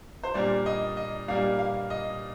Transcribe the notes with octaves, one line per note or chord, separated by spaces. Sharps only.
C5
A#2 G3 A#3 D4 D5
D#5
D#5
A#2 G3 A#3 D4 F5
F5
D#5